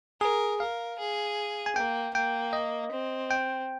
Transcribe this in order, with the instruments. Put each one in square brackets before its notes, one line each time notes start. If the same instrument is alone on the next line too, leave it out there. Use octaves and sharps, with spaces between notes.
[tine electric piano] G#4 [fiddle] A#4
[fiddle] A#4 [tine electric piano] F5
[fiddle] G#4
[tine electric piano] G#5
[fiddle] A#3 [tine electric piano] G5
[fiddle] A#3 [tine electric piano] G5
[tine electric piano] D#5
[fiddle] C4
[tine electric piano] G5